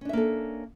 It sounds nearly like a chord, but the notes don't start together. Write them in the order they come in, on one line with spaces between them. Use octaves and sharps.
C#4 D4 E5 A#3 A4